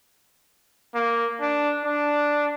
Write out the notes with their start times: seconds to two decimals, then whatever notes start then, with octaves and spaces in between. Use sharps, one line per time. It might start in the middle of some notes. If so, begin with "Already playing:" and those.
0.95 A#3
1.40 D4
1.85 D4